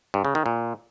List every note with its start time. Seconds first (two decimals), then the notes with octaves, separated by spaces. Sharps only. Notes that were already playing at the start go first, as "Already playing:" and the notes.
0.14 G2
0.25 C#3
0.35 D#3
0.46 A#2